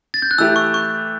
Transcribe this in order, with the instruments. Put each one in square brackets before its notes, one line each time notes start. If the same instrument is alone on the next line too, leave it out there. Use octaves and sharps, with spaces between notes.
[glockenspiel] A6
G6
F#6
[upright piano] E3 A3 E4 G4 [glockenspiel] E6
[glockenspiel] C#6
C#6